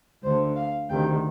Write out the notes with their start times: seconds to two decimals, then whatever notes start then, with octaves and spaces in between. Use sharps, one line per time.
0.23 D2 D3 C5
0.56 F5
0.89 D2 C3 D#3 G5